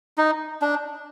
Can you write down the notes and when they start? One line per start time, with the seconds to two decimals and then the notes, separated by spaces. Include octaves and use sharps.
0.18 D#4
0.62 D4